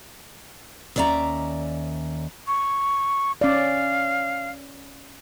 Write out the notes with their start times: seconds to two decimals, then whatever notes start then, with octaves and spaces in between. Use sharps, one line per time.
0.96 D#2 C#4 D5 E5 A#5
2.47 C#6
3.41 C#4 D5 F5